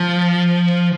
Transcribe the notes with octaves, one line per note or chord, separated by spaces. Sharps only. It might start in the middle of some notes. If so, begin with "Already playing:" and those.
Already playing: F3